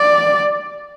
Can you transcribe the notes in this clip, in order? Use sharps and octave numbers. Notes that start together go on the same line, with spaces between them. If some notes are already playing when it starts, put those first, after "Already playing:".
Already playing: D5